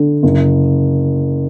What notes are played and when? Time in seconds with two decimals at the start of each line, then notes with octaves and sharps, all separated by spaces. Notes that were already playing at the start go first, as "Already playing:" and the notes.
Already playing: D3
0.23 F#1